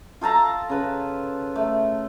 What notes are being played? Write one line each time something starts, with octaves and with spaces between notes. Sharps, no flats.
F4 A4 A5 A#5
C#3 B4
A3